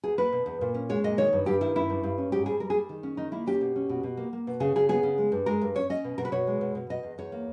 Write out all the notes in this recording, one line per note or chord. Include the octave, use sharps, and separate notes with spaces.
E2 G#4
A#3 B4
B2
E2
A#2
C#4
G#3 C#5
A#2 D#5
D#3 C#5
G2
G2 G4
D#3 E4
C#4 E4
G2
G2
C#4
G#2 G4
G3 G#4
G3 A#4
G#4
G3
D#3
C#4
D#3 D#4
A#3 E4
C#4 G4
B2
C#4
B2
B2
A#3
A#3
B2
C#3 G#4
C#3 G#4
B3 G#4
C#3
G#3
G2
G#3 A#4
G2
C#4 C#5
C#4 D#5
B2
B2 A#4
B4
B2 C#5
G#3
B2
B2
B2 D#5
E2
E2 C#5
A#3